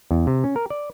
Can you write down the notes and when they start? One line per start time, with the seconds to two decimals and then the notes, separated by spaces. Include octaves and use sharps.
0.11 E2
0.27 C3
0.44 C#4
0.56 A#4
0.70 D5